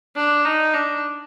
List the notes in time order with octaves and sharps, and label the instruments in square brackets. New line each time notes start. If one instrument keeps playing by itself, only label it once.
[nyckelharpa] D4
D#4
D4